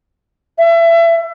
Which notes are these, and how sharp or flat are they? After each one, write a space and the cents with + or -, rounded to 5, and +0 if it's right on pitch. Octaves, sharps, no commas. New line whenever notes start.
E5 +30